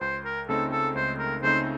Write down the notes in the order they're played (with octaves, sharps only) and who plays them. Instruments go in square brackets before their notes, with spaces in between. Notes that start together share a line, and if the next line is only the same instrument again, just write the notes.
[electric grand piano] C#2 [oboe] C5
[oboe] A#4
[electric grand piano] C#3 A3 C4 D#4 [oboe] A4
[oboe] A4
[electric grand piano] C#2 [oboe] C5
[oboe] A#4
[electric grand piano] C#3 A3 C4 D#4 [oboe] C5